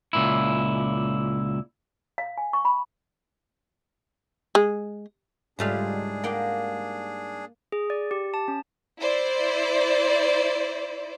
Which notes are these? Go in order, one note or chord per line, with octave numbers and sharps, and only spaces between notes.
C#2 A#2 E4
F5
G#5
C#6
B5
G#3
C#2 G#2 G3 A3 D4 F4 G#4 F5
A#3 F#5 G5
G#4
D5
G4
A5
C#4
E4 C5 D5